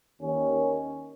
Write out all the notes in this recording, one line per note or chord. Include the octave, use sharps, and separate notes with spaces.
D#2 D#3 C#4